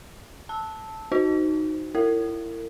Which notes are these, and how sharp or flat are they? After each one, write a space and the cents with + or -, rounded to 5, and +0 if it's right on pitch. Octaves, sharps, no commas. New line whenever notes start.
A5 +0 E6 -15
D#4 +0 F#4 +0 C5 +0
E4 +25 A#4 -40 F5 -45